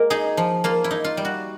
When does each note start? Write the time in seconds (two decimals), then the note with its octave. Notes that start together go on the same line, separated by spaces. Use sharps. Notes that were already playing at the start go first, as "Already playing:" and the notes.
Already playing: G#3 A#3 A#4
0.10 D#4 G#4
0.37 F3
0.64 A#3 F4
0.84 E4
0.91 D#4
1.04 F4
1.17 G3
1.25 F#4